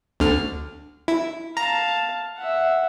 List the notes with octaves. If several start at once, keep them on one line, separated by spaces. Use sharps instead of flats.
D2 D3 F6
E4
F5 A5 A#5
E5 F#5